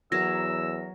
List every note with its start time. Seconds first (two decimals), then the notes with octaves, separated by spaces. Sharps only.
0.12 E2 F#3 A#4 E6 A#6